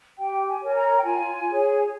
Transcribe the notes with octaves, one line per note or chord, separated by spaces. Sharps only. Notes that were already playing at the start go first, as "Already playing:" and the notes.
G4 G5
G#5
A#4 C#5 G#5
A#5
G5
F4 G#5
G#4 C#5